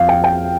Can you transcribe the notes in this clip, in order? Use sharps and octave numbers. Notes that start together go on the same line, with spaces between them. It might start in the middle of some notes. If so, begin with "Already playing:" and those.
Already playing: F2 F3 F5
G5
G5